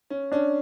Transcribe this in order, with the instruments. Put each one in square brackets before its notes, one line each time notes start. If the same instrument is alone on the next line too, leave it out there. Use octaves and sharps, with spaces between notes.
[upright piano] C#4
[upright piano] C#4 [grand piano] D4